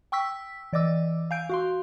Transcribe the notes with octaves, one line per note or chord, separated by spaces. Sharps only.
G5 C#6 E6 B6
E3 D5 D#5 D6 E6
F5 G#5 G6 D7
F#4 F5 C6